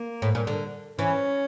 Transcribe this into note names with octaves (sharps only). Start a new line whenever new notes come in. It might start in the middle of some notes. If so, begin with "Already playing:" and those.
Already playing: A#3
A2
A#2
D3
E3 C#4